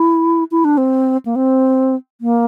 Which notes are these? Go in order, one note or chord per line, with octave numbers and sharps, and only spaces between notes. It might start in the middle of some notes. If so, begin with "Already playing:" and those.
Already playing: E4
E4
D4
C4
A#3
C4
A#3